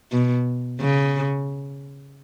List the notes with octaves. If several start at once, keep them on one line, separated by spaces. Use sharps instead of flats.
B2
C#3